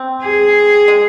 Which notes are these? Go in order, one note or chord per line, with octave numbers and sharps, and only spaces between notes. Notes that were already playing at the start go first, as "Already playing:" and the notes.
Already playing: C4
G#4
G#3